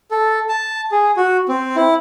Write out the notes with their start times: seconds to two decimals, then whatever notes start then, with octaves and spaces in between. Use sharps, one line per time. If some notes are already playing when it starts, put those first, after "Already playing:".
0.11 A4
0.49 A5
0.92 G#4
1.17 F#4
1.48 C4
1.76 E4